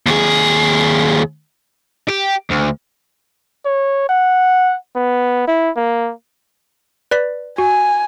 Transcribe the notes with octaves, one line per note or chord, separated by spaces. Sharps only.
D#2 G#4
G4
D2
C#5
F#5
B3
E4
A#3
B4 D5 B6
F#4 G#5